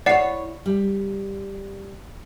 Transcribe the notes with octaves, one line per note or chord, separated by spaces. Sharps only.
E4 C#5 D5 F#5 C7
G3